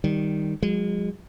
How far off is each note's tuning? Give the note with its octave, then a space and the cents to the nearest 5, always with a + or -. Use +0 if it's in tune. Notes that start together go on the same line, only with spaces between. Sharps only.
D#3 +0 G3 +0
F3 +40 G#3 -30